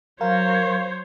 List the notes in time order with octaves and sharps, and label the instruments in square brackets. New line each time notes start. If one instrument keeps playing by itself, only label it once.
[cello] F#3 [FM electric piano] A#4 F5 [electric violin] C5 C#5